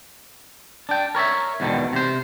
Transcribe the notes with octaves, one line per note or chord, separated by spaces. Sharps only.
D4 G5
A#4 C#5 D5 E5
E2 G#2 B2 D3 D#3
C3 C5